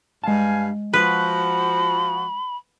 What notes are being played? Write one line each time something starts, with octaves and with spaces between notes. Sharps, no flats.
G2 G#3 F5 G#5 A5
F3 F#4 B4 B5